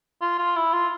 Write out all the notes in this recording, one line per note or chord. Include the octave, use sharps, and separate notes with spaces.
F4
F4
E4
F4